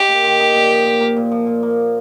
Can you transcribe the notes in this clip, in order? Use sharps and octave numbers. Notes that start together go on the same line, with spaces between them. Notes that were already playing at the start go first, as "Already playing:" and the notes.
Already playing: D#4 G4
A#3
D#3
D#4
A#2
F3
A#2
A#3
A#2
F3
A#2
A#3